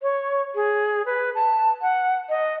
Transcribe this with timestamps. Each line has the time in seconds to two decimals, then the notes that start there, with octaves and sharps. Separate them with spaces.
0.02 C#5
0.55 G#4
1.06 B4
1.35 A5
1.82 F#5
2.29 D#5